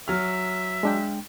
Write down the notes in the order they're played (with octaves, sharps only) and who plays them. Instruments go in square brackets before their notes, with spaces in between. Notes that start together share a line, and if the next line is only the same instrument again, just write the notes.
[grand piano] F#3 F6 [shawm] E5
[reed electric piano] G#3 D4 G5